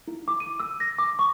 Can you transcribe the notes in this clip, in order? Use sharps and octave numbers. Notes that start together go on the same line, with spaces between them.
E4
D6
D#7
E6
A#6
D6
C#6